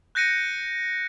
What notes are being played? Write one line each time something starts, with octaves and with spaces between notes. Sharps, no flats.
F#6 G6 A#6 C#7 D#7